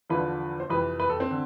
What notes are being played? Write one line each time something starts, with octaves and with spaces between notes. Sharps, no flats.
E2 D3 F3 B4
C5
F2 C3 E3 B4
B4
A4
C4
D3